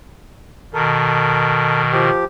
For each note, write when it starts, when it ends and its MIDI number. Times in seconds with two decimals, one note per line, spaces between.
0.73 2.09 47
0.73 2.09 51
0.73 1.82 69
0.73 1.82 70
1.92 2.25 53
1.92 2.25 67